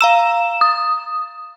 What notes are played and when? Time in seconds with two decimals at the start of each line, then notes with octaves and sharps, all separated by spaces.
0.01 F5 A#5 E6 E7
0.61 D#6